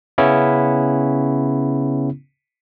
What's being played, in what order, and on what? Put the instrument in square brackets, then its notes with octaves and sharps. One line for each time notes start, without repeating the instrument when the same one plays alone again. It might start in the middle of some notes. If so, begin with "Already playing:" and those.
[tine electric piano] C#3 B3 C#4 E4